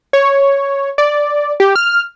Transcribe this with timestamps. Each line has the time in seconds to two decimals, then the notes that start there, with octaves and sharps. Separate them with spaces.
0.13 C#5
0.98 D5
1.60 G4
1.76 F6